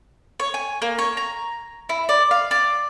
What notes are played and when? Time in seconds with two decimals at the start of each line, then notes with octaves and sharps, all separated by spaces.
0.40 C#5
0.54 G#5
0.82 A#3
0.99 C#5
1.17 A#5
1.89 E4
2.09 D5
2.31 F5
2.51 D5